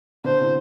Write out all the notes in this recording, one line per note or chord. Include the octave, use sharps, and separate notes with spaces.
B2 D3 C5
A2 C3